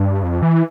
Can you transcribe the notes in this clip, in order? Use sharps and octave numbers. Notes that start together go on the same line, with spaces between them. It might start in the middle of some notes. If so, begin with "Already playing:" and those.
Already playing: G2
F2
E3